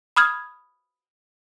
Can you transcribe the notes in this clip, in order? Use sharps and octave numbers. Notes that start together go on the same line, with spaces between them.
B5 D#6 F6 G#6